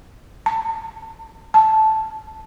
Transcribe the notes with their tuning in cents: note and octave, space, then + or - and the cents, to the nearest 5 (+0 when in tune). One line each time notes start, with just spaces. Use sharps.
A5 +30
A5 -5